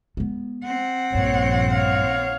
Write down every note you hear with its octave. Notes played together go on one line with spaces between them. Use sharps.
G#3 B3
C4 F#5
A#1 G2 C#5
C#5 F5